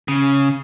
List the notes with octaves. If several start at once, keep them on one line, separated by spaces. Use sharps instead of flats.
C#3